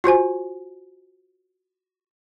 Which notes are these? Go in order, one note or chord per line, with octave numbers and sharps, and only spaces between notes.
F4 F#4 C5 G#5